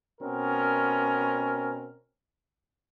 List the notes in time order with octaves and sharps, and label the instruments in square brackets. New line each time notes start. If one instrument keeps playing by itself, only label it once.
[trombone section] B2 C4 C#4 A#4